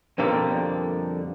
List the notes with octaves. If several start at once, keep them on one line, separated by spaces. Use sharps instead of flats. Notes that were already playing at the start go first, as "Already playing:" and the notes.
F2 B2 D3 G3 A#3 C4